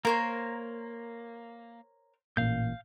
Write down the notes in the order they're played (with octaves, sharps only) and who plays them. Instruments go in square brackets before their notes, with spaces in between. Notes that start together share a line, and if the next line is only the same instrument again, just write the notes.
[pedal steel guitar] A#3 [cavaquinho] A#4 C5 C#5
[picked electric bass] A1 A#2 [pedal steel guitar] F5 G6